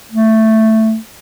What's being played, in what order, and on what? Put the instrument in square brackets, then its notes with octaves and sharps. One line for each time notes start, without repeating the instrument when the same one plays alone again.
[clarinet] A3